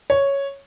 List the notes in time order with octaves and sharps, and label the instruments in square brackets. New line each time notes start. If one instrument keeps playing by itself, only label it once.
[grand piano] C#5